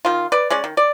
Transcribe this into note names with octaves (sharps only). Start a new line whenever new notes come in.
D#3 F4
B4 D5
G#3 C#4 D5
D#3
D5